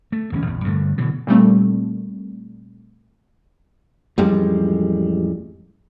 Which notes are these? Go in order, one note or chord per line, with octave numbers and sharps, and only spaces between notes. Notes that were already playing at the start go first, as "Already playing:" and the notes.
A3
D1 E2 C#4
A#1 E2
G2 D3 E3 A3
B2 D3 E3 F#3
A#2 G3 A3 C4
A1 F2 G3 G#3